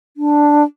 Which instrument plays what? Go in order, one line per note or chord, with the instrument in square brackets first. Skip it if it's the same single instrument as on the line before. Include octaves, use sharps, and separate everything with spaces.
[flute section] D4